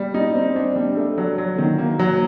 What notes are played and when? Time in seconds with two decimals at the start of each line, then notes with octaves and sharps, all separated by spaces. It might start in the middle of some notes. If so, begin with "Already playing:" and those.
Already playing: G3
0.14 D#4
0.35 C4
0.56 D4
0.76 G3
0.97 A3
1.18 F#3
1.38 F#3
1.59 D#3
1.78 A#3
1.99 F#3